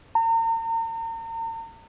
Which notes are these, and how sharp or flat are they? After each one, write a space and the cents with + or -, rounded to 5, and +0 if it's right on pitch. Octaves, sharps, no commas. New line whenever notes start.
A#5 -40